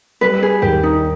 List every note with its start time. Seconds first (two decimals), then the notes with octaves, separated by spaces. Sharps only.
0.21 G3 B4
0.43 G#4
0.62 D#2 G4
0.83 D#4